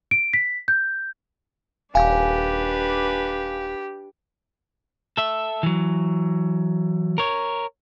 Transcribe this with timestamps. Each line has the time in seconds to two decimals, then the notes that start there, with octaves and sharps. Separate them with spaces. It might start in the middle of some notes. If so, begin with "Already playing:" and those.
0.11 D7
0.33 B6
0.68 G6
1.95 D#1 D4 G4 B4 F5 G#5
5.17 A4 E5
5.63 E3 F#3
7.18 A#4 C#5